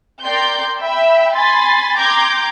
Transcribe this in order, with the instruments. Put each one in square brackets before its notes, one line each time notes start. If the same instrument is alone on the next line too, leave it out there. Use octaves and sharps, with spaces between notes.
[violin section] A#4 D5 G5 C6 G6
E5 G5 B5 E6
G#5 B5 C6 A6
G5 A#5 C6 D6 G6 G#6